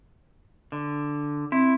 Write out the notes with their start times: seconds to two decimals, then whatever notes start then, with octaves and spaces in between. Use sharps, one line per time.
0.72 D3
1.52 C4 E4